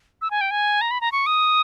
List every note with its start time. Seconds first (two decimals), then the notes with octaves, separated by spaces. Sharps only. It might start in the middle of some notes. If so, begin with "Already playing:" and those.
0.22 E6
0.31 G#5
0.41 G5
0.51 G#5
0.81 A#5
0.91 B5
1.01 A#5
1.12 C#6
1.26 D#6